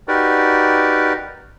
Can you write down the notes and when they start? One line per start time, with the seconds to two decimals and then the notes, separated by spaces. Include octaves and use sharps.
0.08 D#4 F#4 G4 A#4 B4 D5